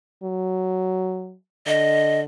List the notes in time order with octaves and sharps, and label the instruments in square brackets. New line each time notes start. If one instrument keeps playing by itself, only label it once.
[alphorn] F#3
[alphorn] D3 [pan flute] D#5